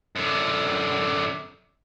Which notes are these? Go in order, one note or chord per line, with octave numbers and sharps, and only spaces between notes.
F#2 D3